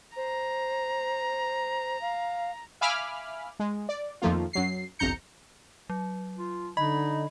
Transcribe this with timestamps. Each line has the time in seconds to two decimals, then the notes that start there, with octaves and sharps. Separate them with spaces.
0.16 C5 A#5
2.01 F5
2.81 E5 F5 G#5 B5 D6 F6
3.59 G#3
3.89 D5
4.22 F2 D#3 F3 A3 A#3 F4
4.53 F#2 F#3 C7
4.99 G1 C2 F2 A#5 G6 C#7
5.90 F#3
6.39 F4
6.77 D3 D#4 D#5 B5